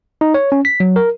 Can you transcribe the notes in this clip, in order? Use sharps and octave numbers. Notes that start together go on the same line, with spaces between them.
D#4
C#5
C#4
B6
F#3
A#4